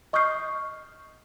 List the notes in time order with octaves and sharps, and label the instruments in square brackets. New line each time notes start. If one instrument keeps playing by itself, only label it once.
[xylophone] D#5 C#6 D#6 F6 G6 C7